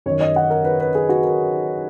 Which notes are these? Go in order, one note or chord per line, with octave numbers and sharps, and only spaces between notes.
F#2 D#3 C#5
D#5
F#5
A#4
B4
B4
G#4
F#4
A#4